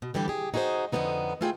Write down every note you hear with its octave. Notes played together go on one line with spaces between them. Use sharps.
B2
G2 D3 E3 G3 G4
G4 G#4
D#4 F#4 G#4 A#4 C5
F2 D3 F3 A3 B3 D#4
A3 E4 F4 G#4 G5